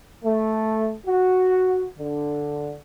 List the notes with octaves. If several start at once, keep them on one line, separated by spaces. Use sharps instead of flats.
A3
F#4
D3